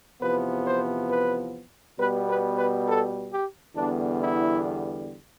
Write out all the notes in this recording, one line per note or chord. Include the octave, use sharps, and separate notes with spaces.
E2 C3 F3 B3 B4
C5
B4
B2 G3 B3 B4
B4
B4
A4
G4
E2 D3 G3 B3 D4
E4